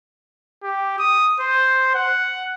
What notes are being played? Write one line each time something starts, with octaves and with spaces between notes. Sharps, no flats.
G4
D#6
C5
F#5